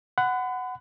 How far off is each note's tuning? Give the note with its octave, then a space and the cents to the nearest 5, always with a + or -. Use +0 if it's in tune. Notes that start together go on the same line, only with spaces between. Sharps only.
F#5 +0 B5 +35